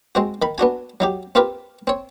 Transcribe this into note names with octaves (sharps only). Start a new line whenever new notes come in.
G#3 C4 F#4
D#3 B5
B3 D4 F#4 G#5
F#3 D#4 G4
C4 F4 G4 A#4 B4
C4 C#5